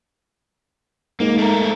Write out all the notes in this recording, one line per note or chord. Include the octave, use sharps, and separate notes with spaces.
G#2 A#3
A3 A#4